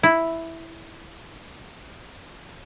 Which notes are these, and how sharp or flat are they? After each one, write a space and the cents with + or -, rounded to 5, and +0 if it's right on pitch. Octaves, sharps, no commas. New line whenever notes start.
E4 +0